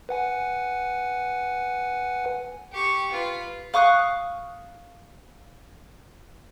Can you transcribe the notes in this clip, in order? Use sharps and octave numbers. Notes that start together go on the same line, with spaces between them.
B4 F#5 G#5
G4 C#6
F4 B4
F5 C#6 D#6 F#6